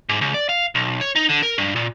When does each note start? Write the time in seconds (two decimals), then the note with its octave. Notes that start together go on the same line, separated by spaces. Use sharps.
0.09 G#2
0.21 C#2
0.34 D5
0.49 F5
0.75 B1
1.01 C#5
1.15 D#4
1.29 D3
1.43 A#4
1.58 G2
1.76 A#2